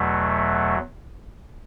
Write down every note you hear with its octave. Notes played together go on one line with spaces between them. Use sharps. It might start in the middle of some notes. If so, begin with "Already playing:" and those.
Already playing: E2 B2 F#3 A3